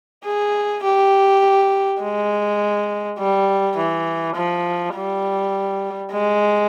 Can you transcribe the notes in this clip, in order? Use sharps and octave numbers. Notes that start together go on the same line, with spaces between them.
G#4
G4
G#3
G3
E3
F3
G3
G#3